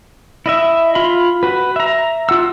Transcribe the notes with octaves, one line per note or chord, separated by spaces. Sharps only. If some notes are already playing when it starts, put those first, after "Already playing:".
E4 D#5 E5
F4 B5
F#4 B4
E5 A#5
F4 F#5 E6